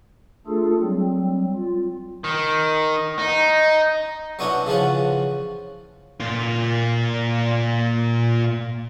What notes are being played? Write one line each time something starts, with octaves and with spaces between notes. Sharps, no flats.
A3 D4 F4 G#4 A4
F#3 G3 C4
F4
D#3
D#4
F#3 B3 C#4 D4 E4
C#3 E3 F3 C#4 F#5
A#2 F4